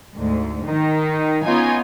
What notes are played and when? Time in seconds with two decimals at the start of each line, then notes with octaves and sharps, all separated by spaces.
0.16 D2 G#2
0.65 D#3 D#4
1.44 B3 C#4 D#4 F4 G#5